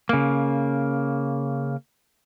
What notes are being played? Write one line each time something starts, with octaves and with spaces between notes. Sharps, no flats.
C#3 A#3